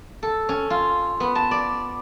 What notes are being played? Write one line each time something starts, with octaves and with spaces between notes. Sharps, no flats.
A4
C#4
F4
B3
A5
D5